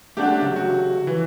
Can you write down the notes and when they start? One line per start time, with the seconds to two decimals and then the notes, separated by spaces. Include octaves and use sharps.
0.17 A3 C#4 D4 G4 F#5
0.42 C#3 F#3 G4
0.56 F#4
1.07 E3